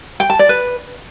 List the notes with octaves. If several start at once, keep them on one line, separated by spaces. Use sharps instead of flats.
G5
A5
D5
B4